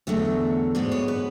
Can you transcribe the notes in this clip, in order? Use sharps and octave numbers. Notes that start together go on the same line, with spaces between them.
E2 D3 F#3 A3 E5
G#2 G#3 B3 D5
C#5
B4